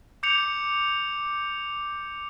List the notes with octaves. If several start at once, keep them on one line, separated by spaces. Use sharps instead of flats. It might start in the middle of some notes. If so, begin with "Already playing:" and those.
D6 G6 C#7 F7